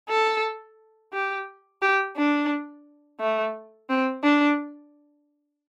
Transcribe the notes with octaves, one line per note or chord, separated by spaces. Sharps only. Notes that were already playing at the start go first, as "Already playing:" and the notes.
A4
G4
G4
D4
A3
C4
D4